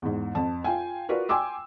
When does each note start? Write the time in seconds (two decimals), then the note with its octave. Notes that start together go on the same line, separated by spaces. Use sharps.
0.02 E2 G#2
0.35 F2 A5
0.64 F4 G5 G#5
1.09 F4 F#4 A#4 B4 D5
1.29 G5 G#5 C6 D6 E6